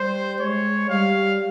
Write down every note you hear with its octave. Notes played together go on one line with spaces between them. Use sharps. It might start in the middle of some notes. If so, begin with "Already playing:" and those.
Already playing: G3 C5
G#3 C#5
G3 F5